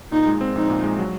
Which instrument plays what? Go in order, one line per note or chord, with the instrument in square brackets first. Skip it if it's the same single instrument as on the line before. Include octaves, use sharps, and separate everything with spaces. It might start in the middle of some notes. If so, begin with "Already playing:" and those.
[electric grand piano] A#2 [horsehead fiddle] D#4
[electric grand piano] G#3
C4
[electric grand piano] A#1 [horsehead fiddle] D#4
[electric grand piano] A#2
G#3
F#3